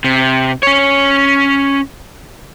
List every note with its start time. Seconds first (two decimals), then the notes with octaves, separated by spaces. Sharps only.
0.04 C3
0.63 C#4 C#5